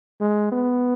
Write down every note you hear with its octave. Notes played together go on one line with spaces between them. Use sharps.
G#3
B3